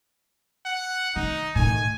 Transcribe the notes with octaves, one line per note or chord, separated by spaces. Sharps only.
F#5
D#3 D#4
A2 D#3 G#5